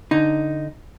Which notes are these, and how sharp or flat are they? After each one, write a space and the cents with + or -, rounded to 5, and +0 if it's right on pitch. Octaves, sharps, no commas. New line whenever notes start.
D3 +0 D#4 +0